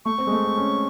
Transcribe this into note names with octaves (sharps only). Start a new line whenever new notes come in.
A3 C#6
C4
G#3
A3
C4
C#4